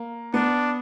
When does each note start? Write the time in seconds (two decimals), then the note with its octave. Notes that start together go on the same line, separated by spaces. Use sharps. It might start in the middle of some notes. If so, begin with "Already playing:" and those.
Already playing: A#3
0.34 B3 D4